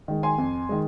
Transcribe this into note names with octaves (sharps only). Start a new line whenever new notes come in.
D#3 G#3
G#5 C6
F2
D#3 G#3